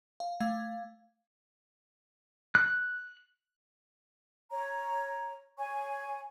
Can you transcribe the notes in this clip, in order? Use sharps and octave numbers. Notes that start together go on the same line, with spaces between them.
F5
A3 F5 G#6
F#6
C#5 A#5
C#5 G#5 C#6